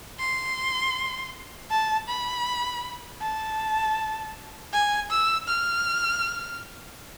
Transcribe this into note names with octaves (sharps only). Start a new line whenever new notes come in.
C6
A5
B5
A5
G#5
E6
F6